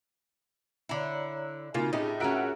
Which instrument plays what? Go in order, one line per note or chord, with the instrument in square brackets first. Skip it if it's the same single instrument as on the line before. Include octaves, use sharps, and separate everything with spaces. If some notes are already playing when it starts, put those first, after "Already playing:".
[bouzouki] D3 E4 [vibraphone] C#5 D5 A#5
[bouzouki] C#3 [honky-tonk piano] A#3 F4 [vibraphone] C4 D#4 F#4
[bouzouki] A2 A3 [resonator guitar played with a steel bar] C#4 G4 [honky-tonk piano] D#4 [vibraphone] F4 G#4
[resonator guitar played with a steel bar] C#4 F#4 A#4 [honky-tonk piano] E5 F#5 D7